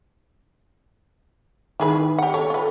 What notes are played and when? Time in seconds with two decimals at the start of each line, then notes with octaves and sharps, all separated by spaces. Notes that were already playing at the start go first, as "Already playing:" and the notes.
1.80 D#3 E4 G#4 B4
2.18 G4 F#5
2.34 A4 C#5
2.50 F4 B4